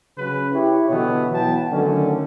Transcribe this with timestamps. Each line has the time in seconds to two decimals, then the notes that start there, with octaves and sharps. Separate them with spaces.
0.18 C#3 F#3 C#4 B4
0.53 E4 G4 C#5
0.90 B2 D3 E3 F#3 B3
1.32 E3 F#3 B3 G5 A5
1.72 D3 D#3 F#3 A3 C#4